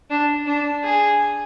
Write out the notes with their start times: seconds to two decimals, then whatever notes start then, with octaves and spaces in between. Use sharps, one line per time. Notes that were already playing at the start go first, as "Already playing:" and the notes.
0.10 D4
0.47 D4
0.84 G#4